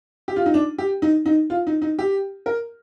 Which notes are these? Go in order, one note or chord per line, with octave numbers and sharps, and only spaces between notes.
G4
F4
D#4
D4
G4
D#4
D#4
F4
D#4
D#4
G4
A#4